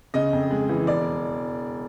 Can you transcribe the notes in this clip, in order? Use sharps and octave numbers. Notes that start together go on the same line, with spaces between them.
C#3 D#5
F2
G#3
E3
E1 D5